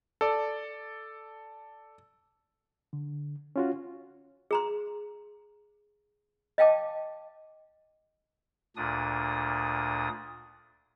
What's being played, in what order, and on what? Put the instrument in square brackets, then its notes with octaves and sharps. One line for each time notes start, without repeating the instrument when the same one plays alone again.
[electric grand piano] A4 D5
[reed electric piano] D3
C#4 F4 F#4
[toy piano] G#4 A#5 C6
D#5 F5 G5 A5 D6
[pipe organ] D2 A#2 D4 D#6